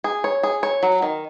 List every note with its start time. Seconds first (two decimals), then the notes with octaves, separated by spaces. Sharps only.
0.04 G#4
0.24 C#5
0.43 G#4
0.63 C#5
0.83 F#3
1.02 D#3